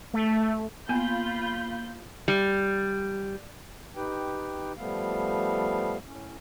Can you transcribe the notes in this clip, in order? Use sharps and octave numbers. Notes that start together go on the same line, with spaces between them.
A3
A#3 B3 F4 G#5 B5 G6
G3
D#4 G4 B4 G5
F3 G3 A3 B3 F5
A2 C#4